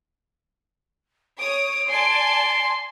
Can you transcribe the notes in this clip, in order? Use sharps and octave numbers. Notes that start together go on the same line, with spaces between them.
C#5 D#6 D7
D5 G#5 A5 C6